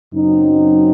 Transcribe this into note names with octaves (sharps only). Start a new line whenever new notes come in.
F#2 C#3 F#3 C4 D#4